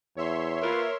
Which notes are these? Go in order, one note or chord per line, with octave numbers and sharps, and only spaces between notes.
E2 C#5 E5 C6
A#3 F4 A#4 B4